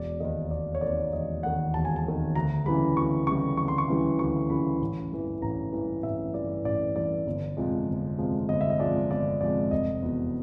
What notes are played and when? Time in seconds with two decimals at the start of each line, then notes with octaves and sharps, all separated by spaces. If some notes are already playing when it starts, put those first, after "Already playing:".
Already playing: E1 D5
0.20 D#2 D#3 D#5
0.51 E1 D5
0.75 C#5
0.81 D#2 D#3 D5
1.12 E1 D#5
1.43 D#2 D#3 F#5
1.74 E1 A5
1.85 G#5
1.96 A5
2.04 D#2 D#3
2.35 D2 A#5
2.66 C#3 E3 G3 B5
2.97 D2 C#6
3.27 C#3 E3 G3 C#6
3.57 D2 C#6
3.68 C6
3.78 C#6
3.89 C#3 E3 G3
4.19 D2 C#6
4.50 C#3 E3 G3 B5
4.81 A1
5.12 G2 E3
5.42 A1 A#5
5.73 G2 E3
6.03 A1 E5
6.34 G2 E3 D5
6.65 A1 D5
6.96 G2 E3 D5
7.27 G1
7.57 F2 C3 F3 G#3
7.88 G1
8.19 F2 C3 F3 G#3
8.49 G1 D#5
8.61 E5
8.70 D#5
8.79 F2 C3 F3 G#3 D5
9.10 G1 D5
9.41 F2 C3 F3 G#3 D5
9.71 F1 D#5
10.02 E2 B2